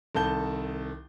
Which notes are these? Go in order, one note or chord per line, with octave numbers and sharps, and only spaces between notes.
C2 D#3 A4 A5 G6 G7